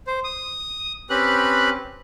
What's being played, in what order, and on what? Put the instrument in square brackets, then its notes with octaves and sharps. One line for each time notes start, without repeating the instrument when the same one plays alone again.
[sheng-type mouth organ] C5
D#6
C4 C#4 G4 B4 B5 F#6